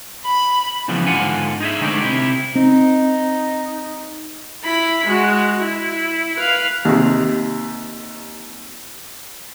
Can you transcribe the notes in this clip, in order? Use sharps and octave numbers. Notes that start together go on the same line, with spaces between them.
B5
C#3 E3 F3 G3 B3
G#2 D3 D#3 F4 F#5 G#5
D#4 G#4 E5
D3 G#3 A3 D#4 C5 D5
C3 E4 G4
C4 D#4
E4 B5
G#3 F#4
E4
B4 F5
D#2 C3